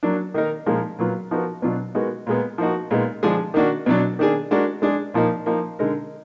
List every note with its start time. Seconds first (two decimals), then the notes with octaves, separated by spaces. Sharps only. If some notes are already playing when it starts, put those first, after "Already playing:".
0.03 F#3 A#3 D4
0.34 D#3 A#3 D#4 A#4
0.66 A#2 F3 G#3 D#4 A#4
0.98 A#2 F#3 B3 F4
1.31 F3 B3 D#4 F#4 A#4
1.62 B2 F#3 D4 F4
1.95 G#3 B3 D#4 F#4 A#4
2.27 A#2 G#3 B3
2.58 F3 A#3 D#4 F#4
2.91 A#2 G#3 B3 D#4
3.23 D3 F3 G#3 D4 G#4
3.54 D#3 A#3 D4 F#4
3.86 B2 F#3 D4
4.19 D#3 A#3 D4 G#4
4.51 G#3 D4 F#4 A#4
4.82 G#3 D4 G#4
5.14 A#2 F3 A#3 D#4
5.46 F3 A#3 D#4
5.79 D3 G#3 D#4 A#4